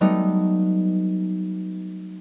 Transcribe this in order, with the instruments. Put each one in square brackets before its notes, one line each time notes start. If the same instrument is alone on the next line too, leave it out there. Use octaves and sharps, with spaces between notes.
[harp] F#3 G3 A3 B3 D#4